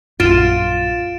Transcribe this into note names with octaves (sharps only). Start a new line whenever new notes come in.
A#1 F#2 F4 A6 D7 E7